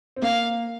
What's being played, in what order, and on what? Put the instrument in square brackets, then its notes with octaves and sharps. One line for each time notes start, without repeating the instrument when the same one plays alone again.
[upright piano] C4
[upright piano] A#3 [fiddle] F5